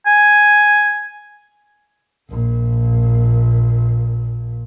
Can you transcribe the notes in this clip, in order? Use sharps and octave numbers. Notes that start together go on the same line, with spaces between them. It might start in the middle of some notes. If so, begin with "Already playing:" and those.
G#5
A#1 A#2